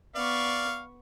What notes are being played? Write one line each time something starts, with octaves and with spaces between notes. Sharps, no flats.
B3 D5 F5 C#6